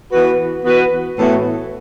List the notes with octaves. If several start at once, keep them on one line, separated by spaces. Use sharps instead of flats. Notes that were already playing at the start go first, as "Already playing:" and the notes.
E3 B3 F#4 B4
E3 B3 F#4 B4
A2 E3 B3 F#4 A4